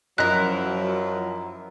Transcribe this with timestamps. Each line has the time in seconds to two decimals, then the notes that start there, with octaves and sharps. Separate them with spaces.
0.18 F#2 F3 F#3 E4 A#4 D#5 F#6 A#6